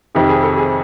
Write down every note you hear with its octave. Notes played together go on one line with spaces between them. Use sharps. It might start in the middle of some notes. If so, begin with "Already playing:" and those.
F2 C3 D#3 G4
G#4
A4
G#4